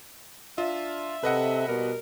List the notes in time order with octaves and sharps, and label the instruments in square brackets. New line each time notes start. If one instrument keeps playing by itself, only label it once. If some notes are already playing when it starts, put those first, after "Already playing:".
[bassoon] D4 [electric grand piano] F4 [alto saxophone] E5
[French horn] C3 [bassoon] A4 [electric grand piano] B4 D#5 F#5
[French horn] B2 [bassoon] G3 [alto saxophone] A#4